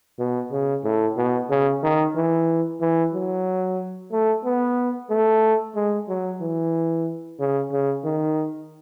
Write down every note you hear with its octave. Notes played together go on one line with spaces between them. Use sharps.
B2
C#3
A2
B2
C#3
D#3
E3
E3
F#3
A3
B3
A3
G#3
F#3
E3
C#3
C#3
D#3